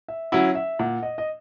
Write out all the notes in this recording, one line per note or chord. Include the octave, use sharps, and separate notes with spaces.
E5
F#3 C#4 E4 F#5
E5
A#2 F#5
D#5
D#5